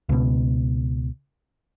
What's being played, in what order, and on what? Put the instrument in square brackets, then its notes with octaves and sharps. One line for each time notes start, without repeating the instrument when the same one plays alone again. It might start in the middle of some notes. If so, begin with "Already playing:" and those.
[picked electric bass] C#2 B2